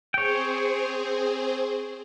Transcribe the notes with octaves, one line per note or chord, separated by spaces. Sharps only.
C4 G#4 C5 C#5 G5